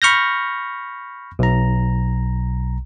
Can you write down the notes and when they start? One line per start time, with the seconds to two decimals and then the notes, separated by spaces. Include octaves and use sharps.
0.02 B5 C#6 F6 G6 A#6
1.39 B1 A#5